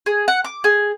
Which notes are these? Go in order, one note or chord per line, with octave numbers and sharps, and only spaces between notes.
G#4
F#5
D6
G#4